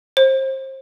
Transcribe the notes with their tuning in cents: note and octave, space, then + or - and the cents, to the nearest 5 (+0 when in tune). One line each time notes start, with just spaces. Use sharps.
C5 +30